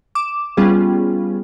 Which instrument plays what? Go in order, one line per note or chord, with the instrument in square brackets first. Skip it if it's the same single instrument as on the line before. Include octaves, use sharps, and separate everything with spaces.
[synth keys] D6 E7
G3 B3 C#4 F4 G#4